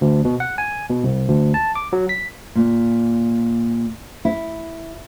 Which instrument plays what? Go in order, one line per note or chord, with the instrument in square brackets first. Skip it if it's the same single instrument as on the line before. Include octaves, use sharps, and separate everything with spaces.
[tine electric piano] D2
B2
F#5
G#5
B2
C2
D2
A5
D6
F#3
B6
[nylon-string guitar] A#2
E4